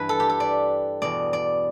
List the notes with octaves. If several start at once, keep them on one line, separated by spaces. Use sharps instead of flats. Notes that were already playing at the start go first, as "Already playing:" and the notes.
Already playing: G2 E3 B4
A4
G4
A4
D5
E2 B2 D5
D5